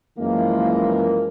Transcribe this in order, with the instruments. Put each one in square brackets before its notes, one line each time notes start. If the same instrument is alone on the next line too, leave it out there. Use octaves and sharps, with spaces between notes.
[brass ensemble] F#2 E3 F3 G#3 A#3